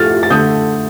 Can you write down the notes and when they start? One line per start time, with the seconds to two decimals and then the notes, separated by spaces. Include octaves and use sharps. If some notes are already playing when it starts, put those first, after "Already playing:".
Already playing: A2 F3 A3 F6 A6
0.23 A6
0.30 D3 A3 D#6 G6